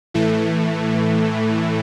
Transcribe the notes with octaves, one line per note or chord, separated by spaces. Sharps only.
A2 E3 A3